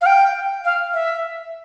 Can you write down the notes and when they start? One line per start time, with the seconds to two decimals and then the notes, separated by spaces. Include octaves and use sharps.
0.01 F5
0.06 G5
0.65 F5
0.93 E5